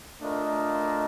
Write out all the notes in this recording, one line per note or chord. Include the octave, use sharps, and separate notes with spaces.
A3 D4 F4 A#4 D#5